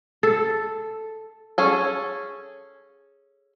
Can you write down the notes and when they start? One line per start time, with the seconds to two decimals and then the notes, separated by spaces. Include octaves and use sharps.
0.23 A4
1.58 C#4 G#4 A4